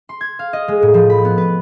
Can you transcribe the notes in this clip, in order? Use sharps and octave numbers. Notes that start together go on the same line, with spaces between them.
C6
G#6
F5
D#5
G#3
A2
F3
B5
B3
B4